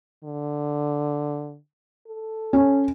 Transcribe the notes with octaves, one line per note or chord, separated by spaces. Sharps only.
D3
A4
C#4